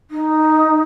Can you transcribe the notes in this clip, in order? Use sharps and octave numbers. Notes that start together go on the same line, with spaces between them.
D#4